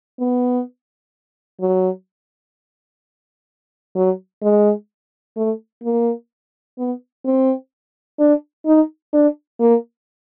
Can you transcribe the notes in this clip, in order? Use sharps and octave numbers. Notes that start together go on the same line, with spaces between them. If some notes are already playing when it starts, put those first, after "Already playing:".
B3
F#3
F#3
G#3
A3
A#3
B3
C4
D4
D#4
D4
A#3